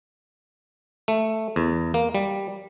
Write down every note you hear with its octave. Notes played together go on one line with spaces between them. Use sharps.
A3
E2
A#3
G3